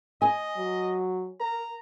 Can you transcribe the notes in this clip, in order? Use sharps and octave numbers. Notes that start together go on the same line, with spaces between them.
D#5 G#5
F#3
A#4 A#5